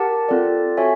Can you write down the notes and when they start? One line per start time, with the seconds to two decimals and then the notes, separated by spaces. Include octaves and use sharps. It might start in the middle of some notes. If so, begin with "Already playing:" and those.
Already playing: G4 A#4 F#5 A5
0.29 C4 F4 A4 D5
0.77 F#4 A4 C#5 E5 G#5